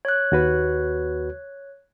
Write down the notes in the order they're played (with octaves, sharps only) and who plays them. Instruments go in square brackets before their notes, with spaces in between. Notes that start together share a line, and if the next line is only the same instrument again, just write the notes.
[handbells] C#5 F#6
[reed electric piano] D#2 F#4 B4